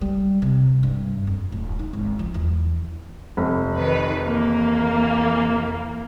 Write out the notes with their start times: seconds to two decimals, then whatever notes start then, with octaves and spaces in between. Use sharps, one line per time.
0.01 G3
0.42 C3
0.83 G2
1.27 F2
1.52 D1
1.79 D#4
1.93 G#1
2.19 F3
2.34 E2
3.37 F1
3.76 D#3 B4
4.26 E3 A#3